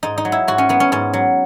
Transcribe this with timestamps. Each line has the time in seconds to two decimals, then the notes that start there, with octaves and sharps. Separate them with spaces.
0.03 G#2 D#4
0.18 D#4
0.25 F#3
0.32 E4
0.48 G#2 F#4
0.58 C#4
0.69 F#3 B3
0.80 C#4
0.92 G#2 C#4
1.13 F#3